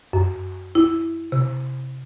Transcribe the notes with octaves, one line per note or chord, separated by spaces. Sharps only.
F#2
E4
C3